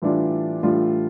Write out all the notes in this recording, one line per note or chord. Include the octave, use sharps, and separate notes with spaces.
A2 E3 G3 D4 F4
A2 E3 G3 D4 F4